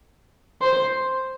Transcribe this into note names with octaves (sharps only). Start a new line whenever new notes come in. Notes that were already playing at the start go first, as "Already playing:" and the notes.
C5